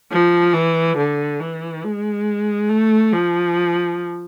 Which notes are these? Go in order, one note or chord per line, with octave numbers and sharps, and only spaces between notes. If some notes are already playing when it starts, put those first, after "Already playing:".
F3
E3
D3
E3
G#3
A3
F3